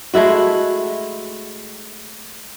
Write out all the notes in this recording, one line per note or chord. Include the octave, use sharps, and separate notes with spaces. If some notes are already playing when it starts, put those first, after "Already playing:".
G#3 A3 E4 F#4